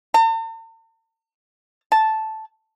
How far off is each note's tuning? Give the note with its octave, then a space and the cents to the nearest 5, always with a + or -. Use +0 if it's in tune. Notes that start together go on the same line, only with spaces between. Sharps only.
A5 +45
A5 -5